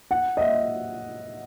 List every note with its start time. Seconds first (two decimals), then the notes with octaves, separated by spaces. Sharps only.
0.11 F#5
0.37 D#5
0.41 E5